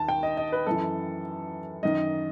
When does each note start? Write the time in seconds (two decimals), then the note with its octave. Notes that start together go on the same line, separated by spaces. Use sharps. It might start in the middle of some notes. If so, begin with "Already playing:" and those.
Already playing: D#2 D#3 A5
0.08 G5
0.23 D#5
0.37 D#5
0.52 B4
0.67 F#2 E3 A4
1.83 F#2 D#3 D#5